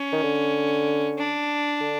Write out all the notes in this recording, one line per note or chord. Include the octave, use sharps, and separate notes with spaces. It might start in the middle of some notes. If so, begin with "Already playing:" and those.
Already playing: C#4
D#3
D3
D4
D3